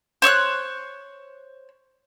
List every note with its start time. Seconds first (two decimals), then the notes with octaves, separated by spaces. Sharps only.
0.22 C5 C#5 E6 F#6